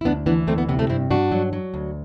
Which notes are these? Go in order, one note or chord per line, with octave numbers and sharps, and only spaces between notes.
E4
D2 B3 D4
E3 B3 D4
D2 A3 C4
B3
C3 B3
A3 C4
G2 C4 E4
G2 D4 F#4
F#3
F#3
D2